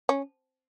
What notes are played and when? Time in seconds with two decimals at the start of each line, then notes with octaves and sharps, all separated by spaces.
0.09 C#4